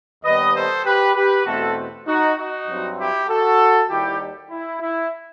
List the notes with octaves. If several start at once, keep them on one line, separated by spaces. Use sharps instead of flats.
D#2 D#3 G3 B3 B4 D#5
A4 C5
G4 B4
G4 B4
E2 B2 A3 C4 F#4 A4
D#4 F#4
D#4 F#4
G2 F#3 C4
E4 G4
F#4 A4
D#2 D#3 G3 E4 G4
E4
E4